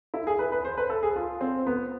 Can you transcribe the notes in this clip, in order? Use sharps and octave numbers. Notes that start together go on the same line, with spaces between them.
E4
G#4
B4
B4
C5
B4
A4
G#4
F4
C4
B3